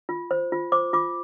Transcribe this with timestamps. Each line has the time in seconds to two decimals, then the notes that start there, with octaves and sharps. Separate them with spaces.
0.09 F4
0.31 C5
0.52 F4
0.72 C5 D6
0.93 F4 D6